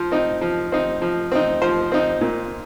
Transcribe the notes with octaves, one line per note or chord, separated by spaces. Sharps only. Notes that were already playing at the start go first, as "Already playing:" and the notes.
Already playing: F3 C5
C4 D#4
F3
C4 D#4
F3
C4 D#4
F3 C5
C4 D#4
A#2